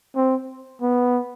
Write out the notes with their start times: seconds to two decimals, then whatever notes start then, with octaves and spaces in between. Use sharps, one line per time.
0.16 C4
0.82 B3